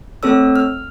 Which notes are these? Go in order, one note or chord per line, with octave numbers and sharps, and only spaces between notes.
A3 C4 A4 C#5 E6
F6